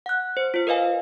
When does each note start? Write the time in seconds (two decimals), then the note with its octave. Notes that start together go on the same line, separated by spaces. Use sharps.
0.06 F#5 F#6
0.37 C5
0.54 F4 C5
0.67 A#4 B4 D#5 F5 G#5